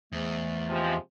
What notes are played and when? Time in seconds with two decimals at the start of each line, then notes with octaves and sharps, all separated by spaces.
0.12 E2 G#2 A3
0.70 C3 F3 G#3